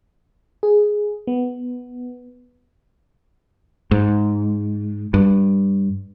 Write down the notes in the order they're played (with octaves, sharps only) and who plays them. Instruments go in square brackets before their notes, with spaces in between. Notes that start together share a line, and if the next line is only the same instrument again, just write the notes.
[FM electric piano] G#4
B3
[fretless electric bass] G#2
G2